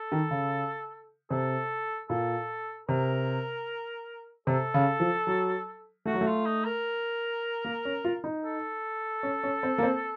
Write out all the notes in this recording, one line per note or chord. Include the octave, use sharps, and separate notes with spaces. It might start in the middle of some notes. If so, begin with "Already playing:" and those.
Already playing: A4
D#3
C#3
C3 A4
A#2 A4
C3 A#4
C3 A4
C#3
F3
F#3
A3 F#4
F#3
A3
F4
D#4
A#4
A#3
C#4
F4
D#4
A4
C#4
C#4
C4
A#3
C4